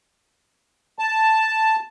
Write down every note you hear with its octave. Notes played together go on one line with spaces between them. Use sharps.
A5